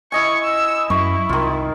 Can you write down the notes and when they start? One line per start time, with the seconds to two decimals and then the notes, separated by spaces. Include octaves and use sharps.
0.12 E4 D#5 G#5 C#6
0.43 E6
0.90 F#2 E4 C#6
1.29 C2 D#3 F4